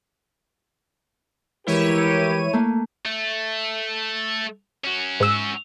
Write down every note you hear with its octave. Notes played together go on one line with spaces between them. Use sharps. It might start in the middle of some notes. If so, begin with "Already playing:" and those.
E3 G#3 E4 G4 A#4 B4 C#5 D#7
A3 A#3
A3
C#4 F#4
G#2 E6